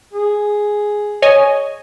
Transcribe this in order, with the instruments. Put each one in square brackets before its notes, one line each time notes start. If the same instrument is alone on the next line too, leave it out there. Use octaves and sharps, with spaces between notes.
[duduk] G#4
[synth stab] C#5 D#5 G#5